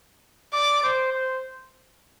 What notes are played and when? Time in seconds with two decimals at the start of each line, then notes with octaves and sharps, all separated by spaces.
0.53 D5 D6
0.83 C5
1.12 C5